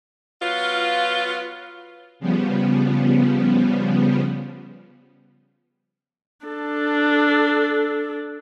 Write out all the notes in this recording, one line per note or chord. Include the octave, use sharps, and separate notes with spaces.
F#3 B3 F4
C#3 F3 G3 B3
D4 A4